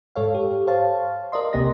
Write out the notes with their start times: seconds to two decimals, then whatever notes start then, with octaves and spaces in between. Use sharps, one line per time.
0.16 G#2 A4 C#5 F5
0.35 G4
0.67 C5 C#5 F5 A5
1.32 A#4 D5 D#5 C6
1.53 C#2 C3 A#3 G4 D#5 A#6